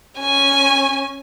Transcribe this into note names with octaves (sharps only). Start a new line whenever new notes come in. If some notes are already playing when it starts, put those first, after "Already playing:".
C#4 G#5